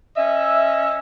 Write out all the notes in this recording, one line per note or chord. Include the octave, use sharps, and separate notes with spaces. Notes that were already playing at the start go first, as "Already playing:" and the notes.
C#4 D#5 E5